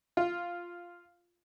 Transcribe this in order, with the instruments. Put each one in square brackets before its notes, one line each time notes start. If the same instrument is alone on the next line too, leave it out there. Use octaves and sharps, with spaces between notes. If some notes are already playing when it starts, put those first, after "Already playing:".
[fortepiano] F4